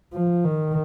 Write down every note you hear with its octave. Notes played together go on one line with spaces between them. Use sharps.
F3
D#3